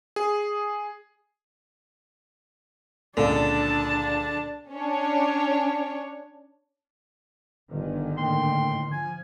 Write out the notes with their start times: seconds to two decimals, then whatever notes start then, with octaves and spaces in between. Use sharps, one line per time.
0.16 G#4
3.17 C#2 A#2 D3 D4 A5
4.70 C#4 D4 C#5
7.70 G1 G#2 D3 D#3
8.17 A2 A#3 G5 C6
8.92 F3 G#5